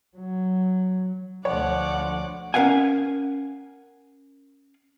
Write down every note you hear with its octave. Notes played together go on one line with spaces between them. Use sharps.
F#3
D2 D3 F3 C#5 D5 F#5
C#4 A#4 B4 F5 F#5 G#5